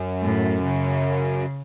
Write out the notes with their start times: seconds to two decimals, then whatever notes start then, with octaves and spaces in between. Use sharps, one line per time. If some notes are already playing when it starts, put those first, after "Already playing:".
Already playing: F#2
0.22 A2
0.64 C#3